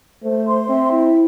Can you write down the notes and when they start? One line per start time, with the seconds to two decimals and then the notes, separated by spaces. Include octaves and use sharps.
0.23 A3 C5
0.47 C6
0.69 C4 E5
0.91 E4